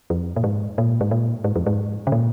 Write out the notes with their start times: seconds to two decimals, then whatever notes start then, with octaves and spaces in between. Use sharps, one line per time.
0.10 F2
0.36 A#2
0.44 G#2
0.78 A#2
1.01 G#2
1.11 A#2
1.44 G#2
1.56 F2
1.67 G#2
2.07 C#3
2.12 A#2